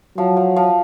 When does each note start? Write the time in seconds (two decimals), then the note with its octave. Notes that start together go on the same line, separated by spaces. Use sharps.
0.18 F3 F#3
0.37 F3
0.56 F3